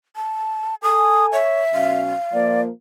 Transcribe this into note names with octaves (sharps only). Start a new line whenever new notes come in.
A5
A4 G#5 D#6
C#5 E5
B2 F#3 C#4 F5
F3 A#3 D5